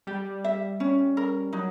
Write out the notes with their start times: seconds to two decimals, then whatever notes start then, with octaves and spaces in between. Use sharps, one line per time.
0.07 G3 G4
0.44 E5
0.80 C#4
1.17 A#4
1.53 F#3 D#4